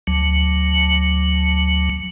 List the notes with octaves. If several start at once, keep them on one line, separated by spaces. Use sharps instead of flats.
D2 F#3